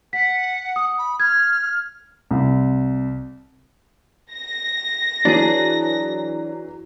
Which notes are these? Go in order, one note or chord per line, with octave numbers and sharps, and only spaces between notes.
F#5 B6
D#6
B5
F6 G#6
C2
A#6
E3 F#3 D4 G#4